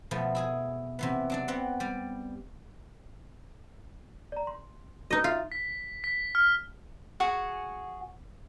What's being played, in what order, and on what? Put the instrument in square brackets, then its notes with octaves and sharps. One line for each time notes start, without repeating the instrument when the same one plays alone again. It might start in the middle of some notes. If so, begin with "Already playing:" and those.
[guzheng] B2 F3 A3 B3
E4 G#4 G#5
C3 E3 B3
F#3 D4 D5
B3 C4 F#5
G3 D5
[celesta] D5 A#5
C6
[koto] D#4 D#5 [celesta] F#4 B4
[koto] F4 [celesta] E5 A6
[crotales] B6
B6
F6
[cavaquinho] F#4 G#4 F#5